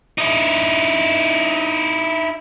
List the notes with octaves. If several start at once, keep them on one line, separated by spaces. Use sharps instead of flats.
D#4 E4